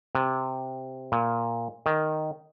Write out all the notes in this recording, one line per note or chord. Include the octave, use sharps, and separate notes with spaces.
C3
A#2
D#3